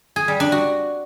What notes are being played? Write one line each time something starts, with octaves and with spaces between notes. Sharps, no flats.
G#4
G3
D4
F#4